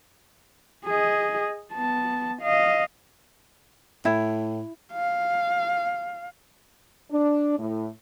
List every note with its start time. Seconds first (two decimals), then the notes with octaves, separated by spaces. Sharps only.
0.86 G#4 D#5
1.74 B3 A5
2.42 D#5 F5
4.05 A2 E4
4.93 F5
7.11 D4
7.58 A2